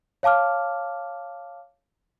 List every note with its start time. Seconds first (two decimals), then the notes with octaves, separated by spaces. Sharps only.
0.23 C#5 F5 A5 D6 F6